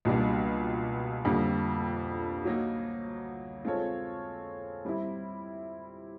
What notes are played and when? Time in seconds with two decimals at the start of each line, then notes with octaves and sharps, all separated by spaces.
0.05 C#2 B2 G3 A#3 D4
1.25 F2 D3 G3 A#3
2.45 F#3 A#3 D#4
3.65 G#3 C4 F4 A4 C#5
4.85 G3 C4 E4